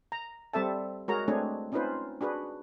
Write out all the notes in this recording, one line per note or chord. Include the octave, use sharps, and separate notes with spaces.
A#5
G3 C4 A4 E5 A5
G#3 F#4 G#4 A#4 C#5 A#5
G#3 A3 C4 D4 G#4 C#5
C4 C#4 D#4 F4 B4 C5
D4 F#4 G#4 B4